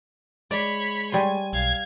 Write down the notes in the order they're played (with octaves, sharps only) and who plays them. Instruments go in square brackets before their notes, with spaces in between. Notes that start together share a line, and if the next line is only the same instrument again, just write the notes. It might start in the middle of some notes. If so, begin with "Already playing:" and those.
[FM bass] G#3 [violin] C#5 B5 [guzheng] D5
[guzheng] G3 C#5 C6 [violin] G#5
[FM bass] B1 [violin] F5 G#6